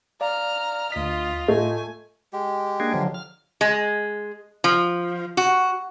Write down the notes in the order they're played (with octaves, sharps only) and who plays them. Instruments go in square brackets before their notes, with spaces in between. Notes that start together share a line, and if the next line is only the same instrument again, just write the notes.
[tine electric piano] D5 F5 [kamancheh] A#5 F6
[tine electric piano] D2 B6 [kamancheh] F4 D#5
[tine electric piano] A2 F4 D#5 [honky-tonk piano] A3 [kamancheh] G#5
[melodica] G#3 G4
[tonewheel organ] A#3 D4 G#4
D3 F3 F#3
F6
[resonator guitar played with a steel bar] G#3
F3
F#4